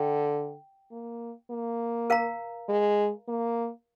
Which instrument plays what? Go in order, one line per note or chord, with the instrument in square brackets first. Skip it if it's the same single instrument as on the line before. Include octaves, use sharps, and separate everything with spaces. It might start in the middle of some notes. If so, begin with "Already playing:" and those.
Already playing: [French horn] D3 [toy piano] G5
[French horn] A#3
A#3
[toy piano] A#4 F5 A#5
[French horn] G#3
A#3